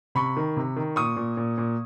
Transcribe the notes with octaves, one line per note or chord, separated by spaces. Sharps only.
C3 B5 C#6
D#3
C3
D#3
A#2 C#6 D#6
A#2
A#2
A#2